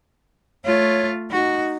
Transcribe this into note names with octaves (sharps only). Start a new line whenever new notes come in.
A3 F4 C#5
D#4 F#4